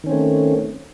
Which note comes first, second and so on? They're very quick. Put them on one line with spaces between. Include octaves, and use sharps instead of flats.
D#3 C#4 C4 A3